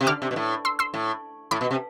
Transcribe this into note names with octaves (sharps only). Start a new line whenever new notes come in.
C3
D3 D6 F6
C3
B2
A2
C6 E6
C6 E6
A2
A2 B5 D6
B2
C3